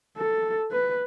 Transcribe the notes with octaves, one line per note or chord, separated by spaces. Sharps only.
A4
B4